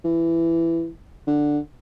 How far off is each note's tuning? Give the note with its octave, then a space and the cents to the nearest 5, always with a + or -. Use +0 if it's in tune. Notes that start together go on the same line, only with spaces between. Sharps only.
E3 +15
D3 +5